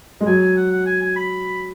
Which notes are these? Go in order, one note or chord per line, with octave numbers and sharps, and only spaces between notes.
G#3
F#3 G#5
G#5
F#5
F#5
G#5
G#5
B5